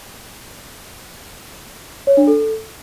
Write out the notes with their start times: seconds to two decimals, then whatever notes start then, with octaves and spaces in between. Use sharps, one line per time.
2.07 C#5
2.17 D4
2.27 A4